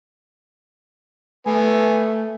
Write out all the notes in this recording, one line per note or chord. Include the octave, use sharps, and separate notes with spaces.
A3 B3 G#5